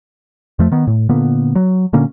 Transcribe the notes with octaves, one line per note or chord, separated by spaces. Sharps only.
F2 F3 A3
D#3 B3
A2
A#2 D3 A#3 B3
F#3
A#2 D3 A#3 C#4